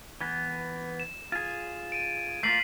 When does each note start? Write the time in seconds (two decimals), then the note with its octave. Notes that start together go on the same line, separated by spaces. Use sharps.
0.21 E3 B3
1.00 E7
1.32 F4 G#4
1.92 D7 D#7
2.43 A3 A#3 F4 B6 C7 F#7